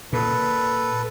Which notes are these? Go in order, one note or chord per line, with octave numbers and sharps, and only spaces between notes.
A#2 A4 B4